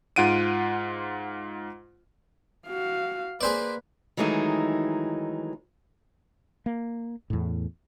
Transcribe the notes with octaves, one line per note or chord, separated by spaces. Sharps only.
G#2 F4 F#5 D7 D#7
F#4 F5
A#3 G#4 B4 C5 D5
D#3 E3 F#3 G#3 A3 D#4
A#3
E2 A2